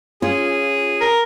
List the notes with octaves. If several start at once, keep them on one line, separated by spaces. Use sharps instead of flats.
C#4 F4 G#4
A#4